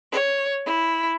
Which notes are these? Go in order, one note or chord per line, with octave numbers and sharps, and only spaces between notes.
C#5
E4